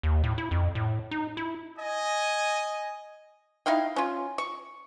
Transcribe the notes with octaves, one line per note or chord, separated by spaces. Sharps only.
D#2
A2
E4
F2
A2
D#4
E4
D#5 G#5
D#4 E4 F5 G5
C#4 F4
C#6